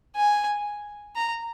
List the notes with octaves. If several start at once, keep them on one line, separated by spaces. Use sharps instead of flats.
G#5
A#5